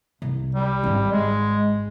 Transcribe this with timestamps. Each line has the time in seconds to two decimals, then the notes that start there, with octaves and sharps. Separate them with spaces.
0.22 C2
0.55 G3
0.83 G#1 G#2
1.12 G#3